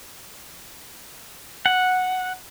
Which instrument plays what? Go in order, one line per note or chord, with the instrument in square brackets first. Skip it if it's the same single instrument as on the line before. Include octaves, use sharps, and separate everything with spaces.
[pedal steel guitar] F#5